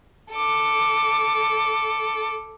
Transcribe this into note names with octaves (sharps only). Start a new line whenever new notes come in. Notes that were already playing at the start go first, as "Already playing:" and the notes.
A4 D6